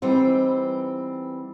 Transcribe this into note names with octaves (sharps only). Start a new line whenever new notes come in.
E3 G3 B3 C4 D#4